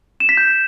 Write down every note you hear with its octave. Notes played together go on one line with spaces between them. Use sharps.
E7
B6
G6